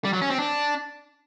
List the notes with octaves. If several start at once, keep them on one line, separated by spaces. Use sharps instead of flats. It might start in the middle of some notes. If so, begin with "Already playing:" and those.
G3
F#3
C#4
C4
D4